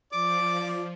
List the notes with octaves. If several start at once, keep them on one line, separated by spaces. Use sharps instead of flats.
F3 D5 D6